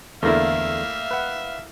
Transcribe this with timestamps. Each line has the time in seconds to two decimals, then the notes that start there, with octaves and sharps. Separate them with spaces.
0.23 E2 D3 A3 A#3 E4 E5 F5
1.11 B4 F#5